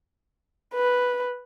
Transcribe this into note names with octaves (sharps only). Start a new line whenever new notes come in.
B4